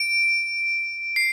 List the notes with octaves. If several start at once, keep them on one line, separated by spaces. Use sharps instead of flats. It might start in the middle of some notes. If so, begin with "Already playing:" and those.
Already playing: D7
C7